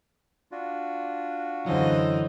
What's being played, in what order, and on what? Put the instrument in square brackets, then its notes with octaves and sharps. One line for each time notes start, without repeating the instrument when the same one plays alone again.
[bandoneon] D4 F4 F#4
[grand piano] F#2 D3 F#3 [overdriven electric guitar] E3 [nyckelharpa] C5 D#5